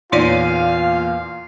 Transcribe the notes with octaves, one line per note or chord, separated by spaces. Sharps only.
E2 A#2 D#4 F4 C#5 D5 F5 D#7